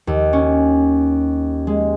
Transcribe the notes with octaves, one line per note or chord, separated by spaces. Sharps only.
D#2
C#4
G#3